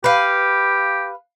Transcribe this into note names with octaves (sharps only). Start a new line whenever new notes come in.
G4 B4 F5